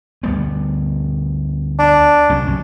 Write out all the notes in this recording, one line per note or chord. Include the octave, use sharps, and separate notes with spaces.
D2 G3 B3
D4
C2 F#3 C#4
B1 G#2 C#4